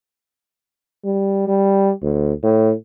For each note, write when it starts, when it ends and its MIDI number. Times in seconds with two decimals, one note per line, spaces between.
1.05 1.48 55
1.48 1.91 55
2.02 2.33 38
2.43 2.72 45